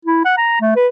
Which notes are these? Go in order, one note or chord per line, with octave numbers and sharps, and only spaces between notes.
E4
F#5
A#5
A3
B4